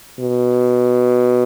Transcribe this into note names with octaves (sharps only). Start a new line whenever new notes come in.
B2